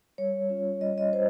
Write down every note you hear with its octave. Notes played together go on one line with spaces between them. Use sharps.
G3 C#5
C#4 F4
G3 D#5
D#5
F4 C5